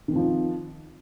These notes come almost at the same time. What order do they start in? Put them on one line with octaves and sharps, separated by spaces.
D#3 C4 F3